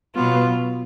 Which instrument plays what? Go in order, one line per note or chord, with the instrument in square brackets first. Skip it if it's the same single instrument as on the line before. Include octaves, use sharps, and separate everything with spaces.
[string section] B2 F#3 B3 [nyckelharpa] F4